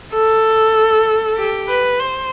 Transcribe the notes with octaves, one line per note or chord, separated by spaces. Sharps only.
A4
G4
B4
C5